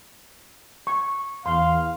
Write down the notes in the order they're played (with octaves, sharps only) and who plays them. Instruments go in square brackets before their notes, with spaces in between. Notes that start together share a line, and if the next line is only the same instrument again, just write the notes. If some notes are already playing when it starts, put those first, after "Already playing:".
[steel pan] C#6
[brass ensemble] E2 F5 [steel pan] C6